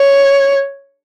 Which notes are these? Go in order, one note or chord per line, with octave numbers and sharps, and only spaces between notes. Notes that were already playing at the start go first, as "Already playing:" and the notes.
Already playing: C#5